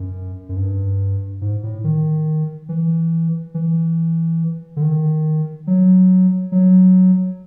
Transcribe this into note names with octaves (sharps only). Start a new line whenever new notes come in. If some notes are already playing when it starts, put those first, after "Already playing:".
Already playing: F#2
F#2
G2
G#2
A2
D#3
E3
E3
D3
D#3
F#3
F#3